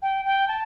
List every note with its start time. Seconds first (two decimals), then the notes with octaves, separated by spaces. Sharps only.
0.02 G5
0.25 G5
0.48 A5